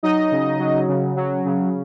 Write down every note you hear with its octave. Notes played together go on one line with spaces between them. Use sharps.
F#3 D#4 D#5
C#3
F#3
C#3
F#3
C#3